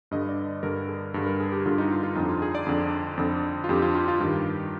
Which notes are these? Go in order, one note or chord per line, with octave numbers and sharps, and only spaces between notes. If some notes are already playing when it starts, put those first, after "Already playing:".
G2 D3 D#5
D5
G2 D3 A#4
G#4
G2 D3
A#4
G#4
G4
G2 D3 F4
D#4
F4
F4
F2 D3 D#4
F4
G#4
D5
F2 D3
F2 D3
F4
F2 D3 G4
F4
F4
F4
G2 D#3 G4